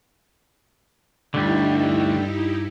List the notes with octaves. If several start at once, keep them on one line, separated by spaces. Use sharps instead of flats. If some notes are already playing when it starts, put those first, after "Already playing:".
D2 G2 D3 G3 D#4 E4 G4